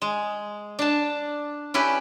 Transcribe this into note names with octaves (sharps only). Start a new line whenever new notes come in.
G#3
D4 A5
C#4 E4 G4 B4